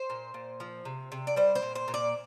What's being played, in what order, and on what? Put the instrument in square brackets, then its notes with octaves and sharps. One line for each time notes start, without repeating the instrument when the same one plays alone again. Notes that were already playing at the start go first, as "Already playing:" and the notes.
Already playing: [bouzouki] C5
A#2
A#2
F3
C3
C3
D5
G3 C5
C5
A#2
C5
A#2
D5